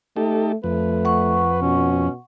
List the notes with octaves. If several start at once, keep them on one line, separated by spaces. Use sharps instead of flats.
A3 D#4 G4 A4
F2 A3 B4
F#5 C#6
B2 C#4